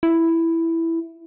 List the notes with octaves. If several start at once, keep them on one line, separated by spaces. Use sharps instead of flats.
E4